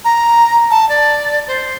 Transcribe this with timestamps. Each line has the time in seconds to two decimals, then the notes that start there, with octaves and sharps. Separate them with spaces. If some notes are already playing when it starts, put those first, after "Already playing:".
0.05 A#5
0.70 A5
0.89 D5
1.47 C5